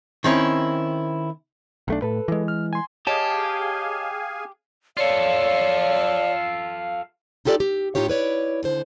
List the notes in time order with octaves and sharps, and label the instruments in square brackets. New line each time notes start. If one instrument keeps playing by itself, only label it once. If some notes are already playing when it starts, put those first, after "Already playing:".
[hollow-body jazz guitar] D#3 C4 C#4 E4
[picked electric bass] B1 A3 D4
[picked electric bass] A2 [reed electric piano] A4 B4
[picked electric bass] E3 G#3
[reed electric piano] F6
G#5 C6
[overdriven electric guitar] G4 [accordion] G#4 F5 G#5 [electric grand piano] C#5 D#5 D6 [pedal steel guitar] A5
[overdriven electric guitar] F4 A4 [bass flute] C#5 [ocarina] D5 [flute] F5
[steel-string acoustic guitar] D#4 F4 G4 A4 B4 D5
G4
A2 D#4 F4 G4 C#5
E4 B4 C#5 D5
D#2 D3 C5